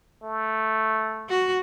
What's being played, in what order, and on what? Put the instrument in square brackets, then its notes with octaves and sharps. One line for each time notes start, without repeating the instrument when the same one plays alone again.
[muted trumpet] A3
[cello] F#4